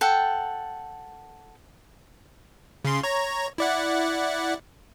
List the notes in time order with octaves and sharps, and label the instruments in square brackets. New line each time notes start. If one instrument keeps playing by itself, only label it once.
[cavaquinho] A4 F#5 G5
[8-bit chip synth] C#3 C6
C#5 A#5
E4 D5 F#5